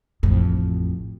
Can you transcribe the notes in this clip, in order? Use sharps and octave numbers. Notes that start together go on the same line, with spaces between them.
A1 F2